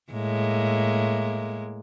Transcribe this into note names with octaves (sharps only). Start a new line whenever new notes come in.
A2 G#3 A#3